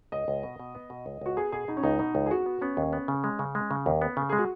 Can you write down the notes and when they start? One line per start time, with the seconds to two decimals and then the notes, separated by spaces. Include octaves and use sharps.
0.12 C#2 D#5
0.28 C#2
0.43 B2
0.59 B2
0.75 B3
0.90 B2
1.06 C#2
1.21 C#2 F#4
1.37 B3 G#4
1.52 B2 G#4
1.68 B2 D#4
1.77 C#4
1.83 C#2 D#4
1.99 B2 D#4
2.15 C#2
2.26 G#4
2.30 B3 F#4
2.46 B3
2.61 B3 C#4
2.77 D#2
2.93 B3
3.08 C#3
3.24 G#3
3.39 C#3
3.55 G#3
3.71 C#3
3.86 D#2
4.02 B3
4.17 C#3
4.29 G#3 G#4
4.38 F#4